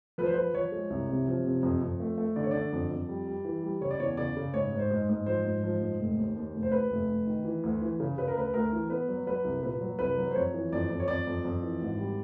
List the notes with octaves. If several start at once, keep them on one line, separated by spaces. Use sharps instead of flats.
F3 B4
C5
F3 B4
F3 C#5
G#3
C2
C3
F3
C3
F2
F2
A3
A3
D3 D5
C#5
D3 D5
F2
F2
G3
G3
E3
G3
C#3 C#5
D5
E2 C#5
C#3 D5
C#3
G#2 C#5
G#2
C5
G#2
G#2
F3 C5
G#2
F3
G#2
F1
D#2
D#2
F1
C5
D#2 B4
F1
F1
D#3
E3
D2
E3
C#3
C#3 B4
A#4
D2 B4
D2 A#4
E3
B3 B4
F#3
F#3 B4
C2
A#2 B4
F#3
C2 B4
F#3
C5
F2 C#5
E3
F2 D5
F2
C#5
F2 D5
F2
F2
E3
G#1
G3